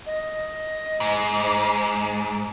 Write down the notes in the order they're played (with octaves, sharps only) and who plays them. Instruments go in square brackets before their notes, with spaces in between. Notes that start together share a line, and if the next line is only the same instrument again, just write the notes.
[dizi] D#5
[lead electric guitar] G#2